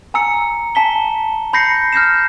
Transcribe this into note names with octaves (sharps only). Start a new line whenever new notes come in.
G#5 A#5 E6 C#7
G#5 A5 B6 G7
B5 G6 A#6 C7 C#7
F6 G6 A#6 C7 E7